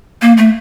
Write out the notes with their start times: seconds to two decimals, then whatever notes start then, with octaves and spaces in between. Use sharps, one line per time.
0.22 A#3
0.37 A3